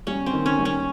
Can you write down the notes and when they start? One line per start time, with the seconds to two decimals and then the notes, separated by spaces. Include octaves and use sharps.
0.07 G3 C#4
0.26 C4
0.33 D#3
0.46 C#4
0.59 G3
0.65 C#4